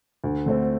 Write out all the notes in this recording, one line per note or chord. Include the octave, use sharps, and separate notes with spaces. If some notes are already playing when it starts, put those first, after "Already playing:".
D2
D3 A3 C4